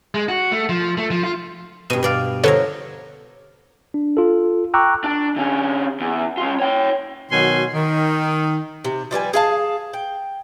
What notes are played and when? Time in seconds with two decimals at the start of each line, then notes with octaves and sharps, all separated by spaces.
0.14 G#3
0.29 F#4
0.52 A3
0.69 F3
0.97 A3
1.11 F3
1.24 F4
1.90 G2 B2 D#7
2.03 B2 D5 F5
2.44 D3 F3 A4 B4 C#5 A#5
3.94 D4
4.17 F4 A4
4.74 G5 A#5 C#6 D6 E6 F#6
5.04 D4
5.36 D3 C#4
6.00 E2
6.38 C#4 F4
6.60 C#5 G5
7.30 B2 D#3 F#3 G#5 C6
7.74 D#3
8.84 C3
9.11 F3 G3 B4 G#5
9.33 G#4 F5 A5
9.93 G5